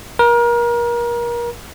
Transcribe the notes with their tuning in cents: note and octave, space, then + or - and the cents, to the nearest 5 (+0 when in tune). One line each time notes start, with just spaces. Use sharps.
A#4 +30